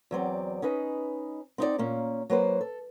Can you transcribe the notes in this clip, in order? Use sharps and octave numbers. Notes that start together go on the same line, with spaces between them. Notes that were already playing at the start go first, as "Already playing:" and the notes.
E2 F#3 C4 D5
C#4 D#4 B4 D#5
C4 D#4 E4 D5
A#2 A#3 C#4
F#3 A#3 B4 C5
A4